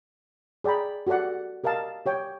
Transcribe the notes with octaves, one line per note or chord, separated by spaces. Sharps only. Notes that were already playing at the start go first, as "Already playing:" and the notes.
G#4 D5 G5 A#5 B5
F#4 G4 A4 D5 F#5
G4 A#4 D#5 F5 A5
G4 C#5 G5